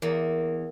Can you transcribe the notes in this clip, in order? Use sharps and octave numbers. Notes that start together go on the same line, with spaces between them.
E2 A#3